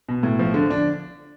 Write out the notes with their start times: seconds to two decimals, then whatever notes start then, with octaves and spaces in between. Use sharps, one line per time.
0.09 B2
0.23 A2
0.39 F3
0.54 D3
0.70 D4